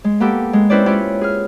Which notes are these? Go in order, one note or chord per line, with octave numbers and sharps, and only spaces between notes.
G#3
A#3 B3 G4 A4
G#3
C4 C#4 E4 B4 C5 D5
C#4 E4 F4 G4
G#4 F6